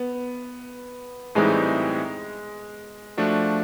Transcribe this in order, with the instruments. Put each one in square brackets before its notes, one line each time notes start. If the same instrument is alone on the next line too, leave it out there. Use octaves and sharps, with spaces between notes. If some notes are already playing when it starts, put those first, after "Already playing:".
Already playing: [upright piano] B3
[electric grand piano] A2 E3 G3 C4 D#4 [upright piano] G#3
[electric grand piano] F3 A3 D4 F#4